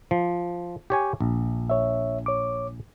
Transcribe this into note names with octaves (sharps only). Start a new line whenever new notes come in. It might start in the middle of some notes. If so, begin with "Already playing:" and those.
F3
G4 C#5 G#5
A#1
C#5 E5
C#5 D6